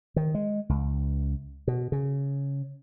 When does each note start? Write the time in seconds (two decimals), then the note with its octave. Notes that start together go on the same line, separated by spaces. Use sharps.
0.16 D#3
0.35 G#3
0.69 C#2
1.67 B2
1.92 C#3